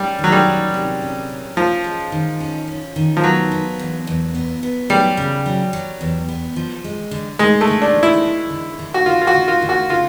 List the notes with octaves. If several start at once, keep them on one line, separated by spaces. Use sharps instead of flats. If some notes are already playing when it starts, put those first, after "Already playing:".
Already playing: G3 C#4
D#3
F#3
G3
C#4
C3
C#4
C#4
F3 C#4
G#3
D#3
C#4
C#4
D#3
F3
F#3 B3
B3
E2
E2
B3
B3
F#3 G3
C#3
F#3
F#3
E2
B3
F3
G#3
D3
D3 G#3
A3
D3
D4
F3
E4
G#3
D3
D3
F#4
D3 F4
F4
F#4
D3
F4
D3
F#4
C#3 F4